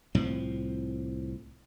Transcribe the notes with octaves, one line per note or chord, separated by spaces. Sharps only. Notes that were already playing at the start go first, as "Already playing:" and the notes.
C2 A2 F3 C4